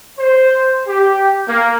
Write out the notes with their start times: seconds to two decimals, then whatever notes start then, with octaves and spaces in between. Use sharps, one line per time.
0.19 C5
0.86 G4
1.46 A#3